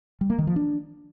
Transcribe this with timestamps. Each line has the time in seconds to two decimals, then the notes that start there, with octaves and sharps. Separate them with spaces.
0.21 G3
0.30 A#3
0.38 D#3
0.47 F3
0.56 D4